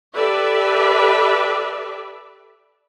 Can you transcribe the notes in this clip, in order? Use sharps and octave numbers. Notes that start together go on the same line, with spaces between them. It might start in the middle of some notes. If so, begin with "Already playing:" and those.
G4 A4 B4 D5 E5